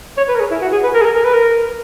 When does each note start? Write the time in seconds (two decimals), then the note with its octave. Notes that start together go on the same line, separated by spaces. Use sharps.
0.17 C#5
0.29 B4
0.35 A#4
0.40 G#4
0.51 E4
0.62 F#4
0.73 G#4
0.83 B4
0.94 A#4
1.01 G#4
1.05 A#4
1.16 A#4
1.25 B4
1.34 A#4